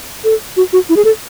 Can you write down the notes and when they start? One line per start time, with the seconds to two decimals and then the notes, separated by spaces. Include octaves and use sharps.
0.24 A4
0.57 F#4
0.73 F#4
0.89 E4
0.96 G#4
1.05 A4